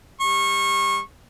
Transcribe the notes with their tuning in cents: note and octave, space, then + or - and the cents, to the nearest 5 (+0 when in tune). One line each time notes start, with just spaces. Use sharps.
G3 +20 C#6 -25